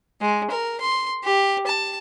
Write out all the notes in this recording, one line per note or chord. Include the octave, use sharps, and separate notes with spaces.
G#3
A#4
C6
G4
A5